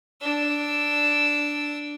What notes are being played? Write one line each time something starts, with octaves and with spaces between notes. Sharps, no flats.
D4 E6